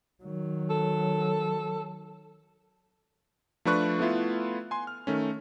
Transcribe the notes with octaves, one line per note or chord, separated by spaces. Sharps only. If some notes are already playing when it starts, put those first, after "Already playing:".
D#3 F#3
A4
F3 A3 D4 B4 C#6 F#6
A3 B3 E4 F4
G#5 C6
F6
D#3 A3 C#4